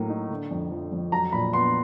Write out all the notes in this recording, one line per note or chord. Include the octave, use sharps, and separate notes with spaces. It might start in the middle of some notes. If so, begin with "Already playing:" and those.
Already playing: A2 F#3 A#3
D#4
D3
F2
F3
F2
F#3 A#5
A#2 B5
B3 C6